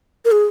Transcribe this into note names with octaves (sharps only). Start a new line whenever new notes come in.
A#4
G#4